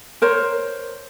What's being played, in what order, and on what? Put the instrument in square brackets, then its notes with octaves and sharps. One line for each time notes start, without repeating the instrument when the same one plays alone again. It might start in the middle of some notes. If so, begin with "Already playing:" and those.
[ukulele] A#4 C5 C#5